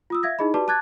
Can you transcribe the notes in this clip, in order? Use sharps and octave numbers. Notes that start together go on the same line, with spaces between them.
F4 D#6 E6
E5 F5 G#6 A#6
D#4 E4 G#4 D#5 B5
F#4 G4 B4 D5 A5 D6
A5 D6 F#6 G#6 A6